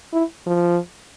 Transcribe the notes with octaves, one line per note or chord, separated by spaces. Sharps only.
E4
F3